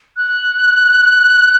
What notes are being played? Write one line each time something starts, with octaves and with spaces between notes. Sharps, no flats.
F#6